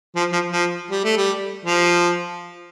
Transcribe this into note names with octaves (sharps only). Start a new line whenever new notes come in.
F3
F3
F3
G3
A3
G3
F3